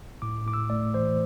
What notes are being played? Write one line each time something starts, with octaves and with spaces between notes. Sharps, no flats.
A2 D6
A2 D6
E6
A3 D5
E3 C5